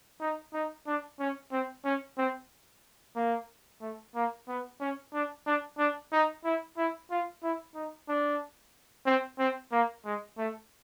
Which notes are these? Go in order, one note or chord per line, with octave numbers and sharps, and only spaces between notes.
D#4
D#4
D4
C#4
C4
C#4
C4
A#3
A3
A#3
B3
C#4
D4
D4
D4
D#4
E4
E4
F4
E4
D#4
D4
C4
C4
A#3
G#3
A3